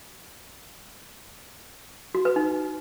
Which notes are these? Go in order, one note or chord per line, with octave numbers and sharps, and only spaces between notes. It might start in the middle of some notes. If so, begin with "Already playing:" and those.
F#4
B4
D#4